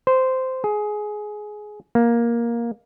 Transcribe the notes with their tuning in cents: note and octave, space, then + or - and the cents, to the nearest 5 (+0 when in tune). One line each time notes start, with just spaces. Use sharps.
C5 -10
G#4 +15
A#3 +10